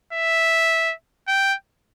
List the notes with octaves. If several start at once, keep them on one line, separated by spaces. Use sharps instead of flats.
E5
G5